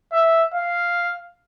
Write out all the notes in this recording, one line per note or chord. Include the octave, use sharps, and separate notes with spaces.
E5
F5